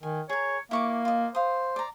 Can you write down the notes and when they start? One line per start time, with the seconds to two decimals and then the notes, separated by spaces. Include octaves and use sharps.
0.03 D#3 G#5
0.29 G#4 A#4 C#5
0.71 A#3 E4 C#6 D6
1.05 F4 D#5
1.35 C5 F5 D#6
1.76 D5 A#5